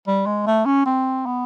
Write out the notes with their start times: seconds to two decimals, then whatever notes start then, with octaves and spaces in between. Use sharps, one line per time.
0.08 G3
0.26 G#3
0.47 A3
0.66 C#4
0.86 C4
1.26 B3